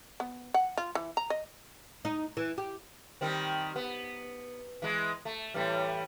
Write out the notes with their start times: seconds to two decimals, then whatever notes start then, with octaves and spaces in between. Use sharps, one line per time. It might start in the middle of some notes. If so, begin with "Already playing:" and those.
0.20 B3
0.54 F#5
0.77 F4
0.95 E3
1.17 A#5
1.30 D#5
2.05 D#4
2.37 E3
2.58 G4
3.21 D#3 G3 C4
3.76 B3
4.82 E3 G#3
5.25 A3
5.54 A2 E3 G3